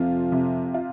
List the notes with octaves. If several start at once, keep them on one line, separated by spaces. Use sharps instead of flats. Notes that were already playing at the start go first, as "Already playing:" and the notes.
Already playing: F2 C3 F4
C3
F4